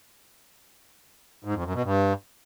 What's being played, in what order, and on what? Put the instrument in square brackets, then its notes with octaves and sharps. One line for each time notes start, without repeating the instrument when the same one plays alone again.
[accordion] G#2
F2
F#2
B2
G2